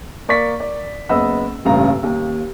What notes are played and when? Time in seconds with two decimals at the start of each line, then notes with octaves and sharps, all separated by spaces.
0.28 A#3 D5 C#6 A6 B6
0.60 D5
1.09 F#1 B3 D#5 F#5 B5 E6
1.65 D#1 A1 G2 C#3 F5 A#5
2.03 D#2